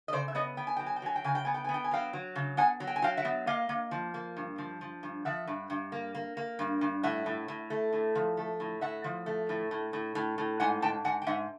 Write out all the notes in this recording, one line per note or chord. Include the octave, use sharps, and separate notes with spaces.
D#5
C#3 C5 D5
E5
B3 C#5 D#5
B3 G5
G#5
F#3 G5
G#5
G5
F#3 G#5
G5
C#3 G#5
G5
B3 G#5
G5
B3 G#5
G5
G#5
F#3 F5 G5
F#3
C#3
B3 F#5 G#5
F#3
G5
G#5
F#3 F5 G5
E5 F#5
B3
A#3 D#5 F5
A#3
F3
A#3
G2
F3
F3
G2
F3 E5 F#5
G2
G2
A#3
A#3
A#3
G2
G2
A2 E5 F#5
A2
A2
A3
A2
F3
A3
A2
A2 E5 F#5
F3
A3
A2
A2
A2
A2
A2
G#2 F#5 G#5
G#2 G5 A5
G#2 F#5 G#5
G5
G#2 E5 F#5